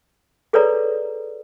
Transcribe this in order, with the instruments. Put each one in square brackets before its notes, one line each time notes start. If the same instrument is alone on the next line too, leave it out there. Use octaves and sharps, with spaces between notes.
[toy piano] G#4 A4 B4 C#5 D5 A#5